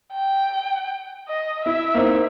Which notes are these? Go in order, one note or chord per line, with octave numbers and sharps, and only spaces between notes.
G5
D#5
E4 E5
A#3 C4 D#4